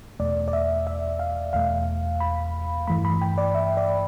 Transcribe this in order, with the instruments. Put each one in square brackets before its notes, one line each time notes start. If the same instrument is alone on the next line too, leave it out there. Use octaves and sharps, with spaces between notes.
[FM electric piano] E2 B2 A3 D5
D5
E5
E5
F5
E2 B2 A3 F5
B5
G2 E3 A3 B5
B5
G5
D5
E5
D5